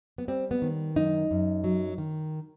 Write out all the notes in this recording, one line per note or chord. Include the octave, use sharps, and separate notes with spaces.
B3
G3 C4
B3
D#3
F#2 D#4
F#2
F#3
D#3